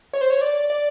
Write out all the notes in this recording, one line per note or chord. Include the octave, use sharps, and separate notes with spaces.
C#5
C5
C#5
D5
D5